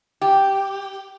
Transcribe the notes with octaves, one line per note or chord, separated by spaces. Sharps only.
G4